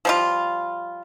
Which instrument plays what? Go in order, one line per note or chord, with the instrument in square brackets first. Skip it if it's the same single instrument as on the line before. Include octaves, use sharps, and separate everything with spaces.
[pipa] F3 G3 F4